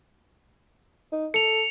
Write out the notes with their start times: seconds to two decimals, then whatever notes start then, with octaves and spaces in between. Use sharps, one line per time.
1.12 D#4
1.34 A4 C#7 F7